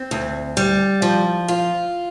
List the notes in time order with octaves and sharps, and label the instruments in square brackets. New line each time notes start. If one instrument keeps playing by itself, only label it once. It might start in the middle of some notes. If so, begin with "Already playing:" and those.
Already playing: [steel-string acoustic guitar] C4
D2
G3
F3
F4